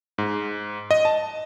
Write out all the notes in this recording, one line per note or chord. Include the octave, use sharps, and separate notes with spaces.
G#2
D#5
A5